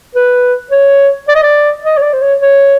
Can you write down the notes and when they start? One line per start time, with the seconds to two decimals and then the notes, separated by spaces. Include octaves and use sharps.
0.15 B4
0.71 C#5
1.28 D5
1.35 D#5
1.43 D5
1.84 D#5
1.97 C#5
2.02 D5
2.13 C5
2.22 C#5
2.40 C#5